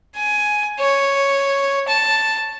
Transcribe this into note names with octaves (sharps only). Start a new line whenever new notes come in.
G#5
C#5
A5